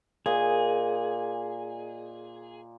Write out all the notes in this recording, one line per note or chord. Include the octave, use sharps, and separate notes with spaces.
A#2 G#4 D#5